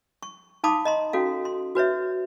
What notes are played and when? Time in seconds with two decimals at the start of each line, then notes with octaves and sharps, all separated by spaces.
0.23 C#6
0.64 D#4 F5 A5 B5 D6 D#6
0.85 D#5 A#5 C6
1.13 C#4 F#4 A4 F5
1.45 C6
1.75 F#4 B4 C#5 E5